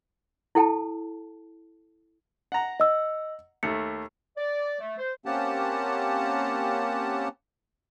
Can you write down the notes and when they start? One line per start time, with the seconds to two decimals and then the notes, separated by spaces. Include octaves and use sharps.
0.55 E4 A4 G5 A5
2.52 F#5 A#5
2.80 D#5 E6
3.63 D#2 A3 C#7
4.37 D5
4.80 A3
4.98 C5
5.26 A#3 C4 C#4 G4 F#5 A5